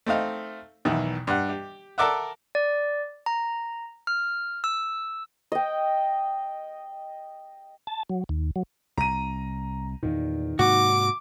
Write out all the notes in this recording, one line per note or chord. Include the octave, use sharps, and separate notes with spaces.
A3 C4 D#4 F5
B1 E2 D#3 E3
G2 F#5
G4
A4 A#4 D5 E5 F#5
D5
A#5
F6
E6
D#5 G5
A5
F#3
D#2
F#3
C2 A#5 D#7
E2 A#2 D#3
G#2 C3 A#3 F#4 D6